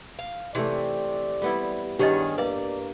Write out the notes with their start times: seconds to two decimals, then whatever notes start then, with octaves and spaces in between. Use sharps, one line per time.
0.19 F5
0.55 C3 E3 A3 D5
1.42 G3 B3 E4
1.99 E2 G2 D#3 C#4 G4 G#4 D#5
2.38 A#3 B4 D5 F5